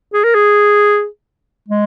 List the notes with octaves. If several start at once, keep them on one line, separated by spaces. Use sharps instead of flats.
G#4
A#4
G#4
G#3